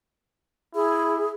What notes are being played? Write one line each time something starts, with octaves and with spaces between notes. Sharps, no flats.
E4 G#4